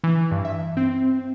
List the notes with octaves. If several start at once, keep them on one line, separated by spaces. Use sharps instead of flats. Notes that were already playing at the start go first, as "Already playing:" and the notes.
E3
G2
E5
C4